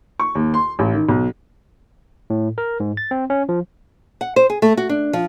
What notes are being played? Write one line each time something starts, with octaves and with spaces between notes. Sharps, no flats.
C#6
D#2
C6
A1
D#3
B1
A2
A#4
G#2
A6
C4
C#4
F3
F#5
C5
G#4
A3
F#4
D4
F3